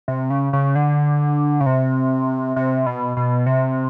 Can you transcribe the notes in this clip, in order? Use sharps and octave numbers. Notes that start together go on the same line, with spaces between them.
C3
C#3
C#3
D3
C#3
C3
C3
B2
B2
C3